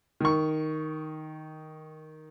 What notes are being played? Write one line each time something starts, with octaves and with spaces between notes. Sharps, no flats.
D#3 C#6